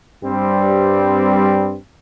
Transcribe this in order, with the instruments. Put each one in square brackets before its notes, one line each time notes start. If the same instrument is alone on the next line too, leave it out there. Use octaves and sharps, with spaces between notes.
[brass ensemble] G2 G3 C4